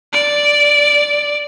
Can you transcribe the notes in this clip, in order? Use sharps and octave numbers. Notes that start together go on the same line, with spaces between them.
D5